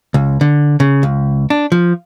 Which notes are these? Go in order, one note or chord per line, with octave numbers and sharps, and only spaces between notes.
C#2
D3
C#3
C#2
D4
F3